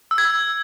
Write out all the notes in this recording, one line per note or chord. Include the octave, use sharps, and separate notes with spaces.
E6
G#6
E6